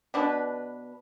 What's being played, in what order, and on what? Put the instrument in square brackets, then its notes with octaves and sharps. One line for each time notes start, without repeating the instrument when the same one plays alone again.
[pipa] B2 D4 B4